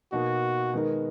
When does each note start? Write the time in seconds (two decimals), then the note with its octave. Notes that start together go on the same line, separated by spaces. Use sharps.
0.12 B2 A#3 D#4 F#4
0.73 D#3 G#3 B3 D#4 A#4